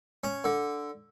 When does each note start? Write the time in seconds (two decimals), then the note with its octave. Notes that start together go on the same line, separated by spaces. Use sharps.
0.24 C#4
0.44 D3